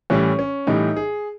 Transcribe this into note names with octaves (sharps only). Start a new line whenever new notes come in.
A2 E3 G3 C#4
C#4
A2 E3 G3 D#4
G#4